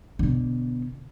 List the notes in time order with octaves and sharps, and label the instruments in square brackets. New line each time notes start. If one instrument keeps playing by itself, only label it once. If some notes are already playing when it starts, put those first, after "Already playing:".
[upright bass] B2 D3